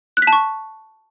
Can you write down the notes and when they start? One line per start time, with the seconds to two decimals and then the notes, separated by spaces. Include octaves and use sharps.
0.17 F#6
0.22 B6
0.27 A5
0.33 C#6